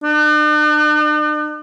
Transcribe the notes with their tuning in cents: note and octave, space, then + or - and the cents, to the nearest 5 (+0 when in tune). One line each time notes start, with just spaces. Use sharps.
D4 +45